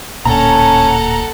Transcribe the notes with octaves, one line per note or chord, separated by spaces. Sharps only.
D1 A#2 C#4 A4 F#5 A5 A#5